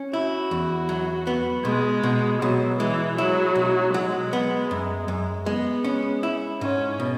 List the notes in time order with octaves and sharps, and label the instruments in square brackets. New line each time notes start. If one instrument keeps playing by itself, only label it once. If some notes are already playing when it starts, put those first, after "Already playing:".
Already playing: [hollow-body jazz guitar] C#4
[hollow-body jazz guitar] E4 [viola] F#4
[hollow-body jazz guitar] E2
F#3
B3
[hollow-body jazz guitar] B2 [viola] G#3
[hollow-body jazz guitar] B2
[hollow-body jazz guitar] B2 [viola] F#3
[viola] E3 [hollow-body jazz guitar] G#3
[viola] F#3 [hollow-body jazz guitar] E4
[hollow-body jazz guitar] B1
[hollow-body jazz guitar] F#3 [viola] G#3
[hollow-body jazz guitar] B3
F#2
F#2
[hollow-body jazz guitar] G#3 [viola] B3
[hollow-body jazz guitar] C#4
E4
[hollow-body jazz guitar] G#2 [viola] C#4
[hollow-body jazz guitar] B2